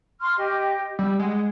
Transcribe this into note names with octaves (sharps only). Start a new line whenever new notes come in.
C6 C#6 F6
G4 D#5
G3 E6
G#3 F#5